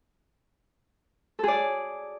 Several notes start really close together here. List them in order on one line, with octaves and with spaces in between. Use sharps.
A4 G#4 D5